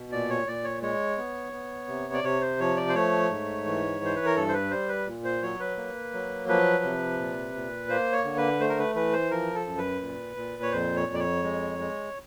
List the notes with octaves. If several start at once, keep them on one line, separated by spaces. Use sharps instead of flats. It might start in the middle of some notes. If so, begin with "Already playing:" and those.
Already playing: B2
A#2 D5
C#5
A#2 D5
C#5
G#3 C#5
B3
B3
C3
D5
C3 C#5
C5
F3 C#5
D5
C5
A3 C#5
G#2
E3
E3 C5
B4
A#4
G2 A4
C5
B4
G3 C5
B4
A#2
C5
F#3 C#5
B4
A#3
F#3
F3 B4
C3
A#2
A#2
A#3 C5
C#5
D3
B4
A3 C5
A#4
B4
E3 B4
C5
F3 A#4
A4
F#2
B4
A#2
A#2
C#5
F2 C5
C#5
F2
D5
C#5
G#3
G#3